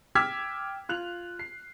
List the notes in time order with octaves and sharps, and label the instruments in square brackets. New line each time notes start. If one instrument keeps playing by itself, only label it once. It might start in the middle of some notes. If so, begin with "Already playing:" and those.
[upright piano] G5 D6 E6 F6 G#6 B6
F4 F#6 F7
C7